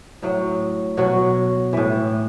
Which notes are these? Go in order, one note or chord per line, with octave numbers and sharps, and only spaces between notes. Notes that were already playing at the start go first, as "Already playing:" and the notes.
A2 F#3
B2 F#3 F#4
A2 E3